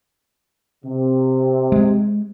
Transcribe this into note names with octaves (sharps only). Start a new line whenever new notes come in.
C3
G#3